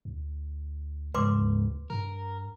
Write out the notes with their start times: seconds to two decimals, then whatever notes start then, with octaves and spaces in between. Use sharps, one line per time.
0.05 D2
1.14 C#2 G#2 B4 C6 D6
1.31 D2
1.90 G2 A#4